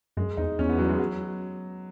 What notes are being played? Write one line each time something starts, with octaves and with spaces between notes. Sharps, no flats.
F#2 G#3
E2 D#4
E2 C#4
B3
F#3
G#3
F#3